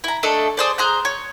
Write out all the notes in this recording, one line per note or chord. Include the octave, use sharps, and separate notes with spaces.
E4 A#5
A3 D4 A4 D#5
G#4 C5 D5
G#4 C5 A#5 F#6
C#5